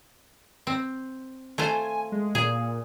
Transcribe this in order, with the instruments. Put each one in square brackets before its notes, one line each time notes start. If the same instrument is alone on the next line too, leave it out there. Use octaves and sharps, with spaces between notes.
[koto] C4
[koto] A3 F4 C5 [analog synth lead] G#5
[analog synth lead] G#3
[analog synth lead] A#2 [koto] G#4